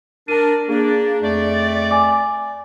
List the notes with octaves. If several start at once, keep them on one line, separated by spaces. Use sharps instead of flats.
D4 A#4 A5 D#7
A#3 D4 G#4
F2 A3 D5
G#5 D6